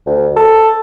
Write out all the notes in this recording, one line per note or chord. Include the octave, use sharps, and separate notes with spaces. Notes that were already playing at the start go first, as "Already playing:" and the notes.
D2
A4